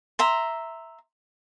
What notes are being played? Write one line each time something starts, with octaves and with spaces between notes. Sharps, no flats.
E5 A#5 C6